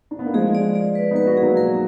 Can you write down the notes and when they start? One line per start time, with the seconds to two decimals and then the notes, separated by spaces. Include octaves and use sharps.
0.11 D4
0.19 B3
0.26 A#3
0.34 F3 G#3 G#4
0.55 D5
0.75 D5
0.95 B4
1.11 B3 D#4
1.16 B4
1.26 D#4 F#4
1.37 F#3 A#3 G#4
1.57 A#4